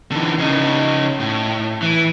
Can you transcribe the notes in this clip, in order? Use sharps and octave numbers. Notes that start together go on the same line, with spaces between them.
D3 E3
C#3 D#4
A2
E3